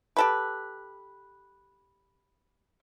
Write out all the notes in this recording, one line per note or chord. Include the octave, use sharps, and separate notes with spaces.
G4 A4 B4